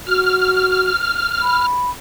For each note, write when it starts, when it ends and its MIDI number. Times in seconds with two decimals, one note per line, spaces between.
0.07 0.90 66
0.07 1.67 89
1.41 1.90 83